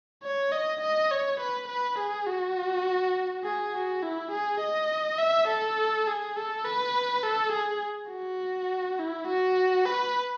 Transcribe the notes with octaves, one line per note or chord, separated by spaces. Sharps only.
C#5
D#5
D#5
C#5
B4
B4
G#4
F#4
G#4
F#4
E4
G#4
D#5
E5
A4
G#4
A4
B4
A4
G#4
F#4
E4
F#4
B4